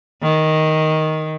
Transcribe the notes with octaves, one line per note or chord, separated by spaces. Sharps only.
D#3